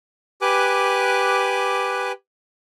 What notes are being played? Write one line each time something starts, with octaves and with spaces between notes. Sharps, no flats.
G4 B4 G#5 D6 F#6